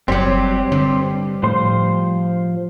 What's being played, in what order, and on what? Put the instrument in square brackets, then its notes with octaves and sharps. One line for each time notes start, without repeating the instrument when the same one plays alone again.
[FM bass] F#1 [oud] F#3 G3 [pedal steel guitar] C4 G4
[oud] G2 [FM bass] D3
[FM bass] A2 [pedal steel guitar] F3 C5 C6